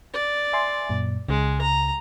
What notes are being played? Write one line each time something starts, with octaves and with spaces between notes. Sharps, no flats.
D5
E5 G#5 C6
F#2 A#2
C#2 C#3 G#3
A#5